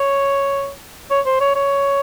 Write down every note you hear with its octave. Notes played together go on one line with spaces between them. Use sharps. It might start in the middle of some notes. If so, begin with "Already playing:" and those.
Already playing: C#5
C#5
C5
C#5
C#5